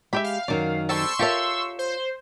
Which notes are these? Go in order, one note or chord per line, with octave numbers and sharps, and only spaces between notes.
G#3 G4 E5 G5 B5
F5
F#2 D#3 F#3 D5
G3 C4 A4 C6 C#6 E6
F4 G4 A4 A#4 C#5 E5
C5